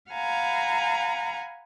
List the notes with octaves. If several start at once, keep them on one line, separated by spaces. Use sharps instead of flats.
F5 F#5 G#5 A#5 B5